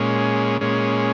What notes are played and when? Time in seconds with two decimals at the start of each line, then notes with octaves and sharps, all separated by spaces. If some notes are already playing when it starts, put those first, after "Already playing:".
Already playing: A#2 G#3 C#4
0.61 A#2 G#3 C#4